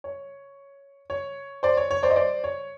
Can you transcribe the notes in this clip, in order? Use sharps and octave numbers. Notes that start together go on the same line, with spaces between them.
C#5
C#5
C5 D5
C#5
C#5
C5 D5
D#5
C5 D5
C#5